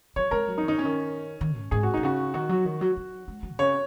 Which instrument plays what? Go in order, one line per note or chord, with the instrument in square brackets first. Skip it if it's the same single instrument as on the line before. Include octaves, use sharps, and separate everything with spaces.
[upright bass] F#3 [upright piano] C#5
[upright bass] G#3 [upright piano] A#4
[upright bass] F#3
[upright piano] D#4
[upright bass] D#3
[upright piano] D#4
[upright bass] C#3 [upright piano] C#4
[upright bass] D#3
D#3
G#2
[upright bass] G#2 [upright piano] G#4
[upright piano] F#4
[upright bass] A#2 [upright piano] D#4
[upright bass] C#3 [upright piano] F#4
[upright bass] D#3 [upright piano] F#4
[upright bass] F#3
D#3
F#3
F#3
G#3
F#3
A#2
[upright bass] C#3 [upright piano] C#5